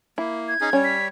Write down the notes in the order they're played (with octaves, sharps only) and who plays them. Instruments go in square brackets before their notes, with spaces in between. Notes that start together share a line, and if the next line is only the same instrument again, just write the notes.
[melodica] A#3 [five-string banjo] E4
[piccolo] G#6
[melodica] C#4 D#4 G#4
[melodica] G3 C#5 [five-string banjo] C#4
[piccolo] B6